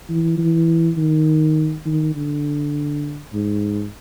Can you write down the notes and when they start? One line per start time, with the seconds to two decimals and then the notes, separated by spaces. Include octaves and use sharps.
0.09 E3
0.38 E3
0.97 D#3
1.86 D#3
2.16 D3
3.33 G#2